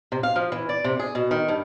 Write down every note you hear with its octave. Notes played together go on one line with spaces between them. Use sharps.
C3
F5
F3
E3
D5
C3
G#4
B2
D#3
G2